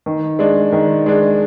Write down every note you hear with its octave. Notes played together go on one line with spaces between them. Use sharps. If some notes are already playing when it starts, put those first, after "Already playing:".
D#3
G#3 D4
D#3
G#3 D4